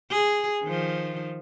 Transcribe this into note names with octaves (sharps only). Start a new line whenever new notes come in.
G#4
D#3 F3